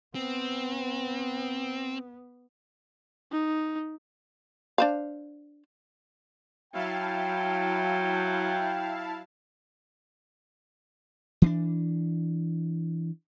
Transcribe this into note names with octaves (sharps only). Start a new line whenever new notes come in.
B3 C4
D#4
D4 C5 F5
F#3 E4 F5 G5 A5
E3 C#4 D4